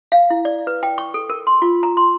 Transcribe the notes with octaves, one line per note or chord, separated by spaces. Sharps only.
F5
E4
D5
B4
G5
C#6
A4
A#4
C6
F4
A#5
C6